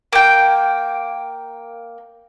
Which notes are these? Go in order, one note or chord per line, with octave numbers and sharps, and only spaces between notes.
A#3 G5